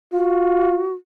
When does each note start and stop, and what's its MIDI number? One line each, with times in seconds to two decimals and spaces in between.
0.13 0.86 65
0.13 0.93 66